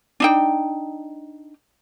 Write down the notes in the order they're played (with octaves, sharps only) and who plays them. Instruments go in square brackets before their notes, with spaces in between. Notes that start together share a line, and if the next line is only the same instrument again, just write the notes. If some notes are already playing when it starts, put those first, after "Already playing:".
[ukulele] D4 D#4 G5